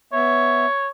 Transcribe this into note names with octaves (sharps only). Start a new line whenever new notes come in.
B3 C#5 E5